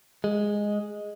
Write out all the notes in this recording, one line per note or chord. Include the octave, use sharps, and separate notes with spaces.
G#3